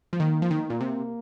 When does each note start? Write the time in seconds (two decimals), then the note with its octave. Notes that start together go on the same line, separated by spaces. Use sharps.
0.13 F3
0.20 D#3 A#3
0.42 F3
0.51 D#3
0.66 A#2 A#3
0.81 C3